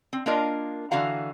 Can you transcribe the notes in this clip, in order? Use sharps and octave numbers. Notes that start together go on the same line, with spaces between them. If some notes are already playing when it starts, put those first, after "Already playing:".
C4
A#3 D4 F4 A#4 D#5
D3 E3 F#4 F5 A#5